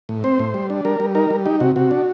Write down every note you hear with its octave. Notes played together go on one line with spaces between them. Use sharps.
A2
C4 C5
A2
G3
D4
G3 A#4
G3
D#4 A#4
G3
D#4 G4
C3 F#4
C3 F#4
D4